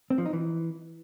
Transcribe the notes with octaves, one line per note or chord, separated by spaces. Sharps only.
C4
F3
D#4
E3